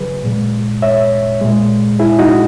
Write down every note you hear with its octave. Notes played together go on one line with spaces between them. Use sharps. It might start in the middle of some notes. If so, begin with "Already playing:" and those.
Already playing: C#3 F#3 G#4 B4
A#2 G#3
C#5 E5
A#2 G#3
E4 G#4
D#4 F#4